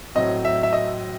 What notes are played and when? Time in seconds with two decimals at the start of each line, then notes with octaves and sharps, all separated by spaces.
0.15 A2 F#3 C4 D#5
0.45 E5
0.63 E5
0.73 D#5